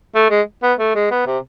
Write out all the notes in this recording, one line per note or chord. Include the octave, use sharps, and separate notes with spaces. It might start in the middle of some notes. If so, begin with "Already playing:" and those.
A3
G#3
B3
A3
G#3
B3
C3